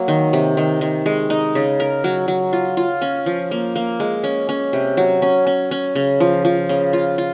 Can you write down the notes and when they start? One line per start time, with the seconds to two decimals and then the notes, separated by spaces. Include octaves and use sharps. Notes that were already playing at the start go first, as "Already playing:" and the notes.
Already playing: F#3 A#3
0.08 D#3
0.33 C3
0.57 D#3
0.81 D#3
1.06 G#3
1.30 D#4
1.55 C#3
1.80 A#4
2.04 F#3
2.28 F#3
2.53 F4
2.77 F4
3.01 C#4
3.26 F3
3.51 A#3
3.76 A#3
4.00 G#3
4.24 C#4
4.49 C#4
4.73 C3
4.97 F#3
5.22 C#4
5.47 C#4
5.71 C#4
5.95 C#3
6.20 F3
6.45 F3
6.69 C#3
6.93 F4
7.18 F4